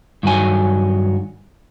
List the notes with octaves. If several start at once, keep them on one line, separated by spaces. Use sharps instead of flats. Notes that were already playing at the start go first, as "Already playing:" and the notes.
G2 D#3 F#3 G#5